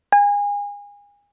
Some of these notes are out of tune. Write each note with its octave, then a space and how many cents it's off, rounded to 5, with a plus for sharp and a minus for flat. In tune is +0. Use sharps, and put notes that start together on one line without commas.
G#5 -30